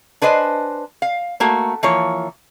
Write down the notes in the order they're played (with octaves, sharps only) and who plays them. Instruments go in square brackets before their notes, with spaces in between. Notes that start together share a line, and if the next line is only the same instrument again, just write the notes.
[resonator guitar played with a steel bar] D4 B4 C5 D#5 G#5
F5
A3 A#3 F#4
E3 F3 A#3 C#5